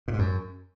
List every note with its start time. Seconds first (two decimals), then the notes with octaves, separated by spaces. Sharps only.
0.08 A#2
0.13 G#2
0.19 F#2